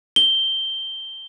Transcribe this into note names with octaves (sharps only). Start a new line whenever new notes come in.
G7